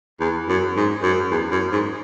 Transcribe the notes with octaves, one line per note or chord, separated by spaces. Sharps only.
E2
F#2
G#2
F#2
E2
F#2
G#2